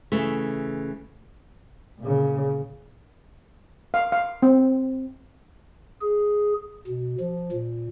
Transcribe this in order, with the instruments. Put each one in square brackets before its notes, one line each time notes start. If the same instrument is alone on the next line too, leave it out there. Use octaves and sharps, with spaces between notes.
[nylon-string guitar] C#3 E3 A3
[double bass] A#2 C#3
[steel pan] F5
F5
C4
[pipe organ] G#4
B2
F3
A#2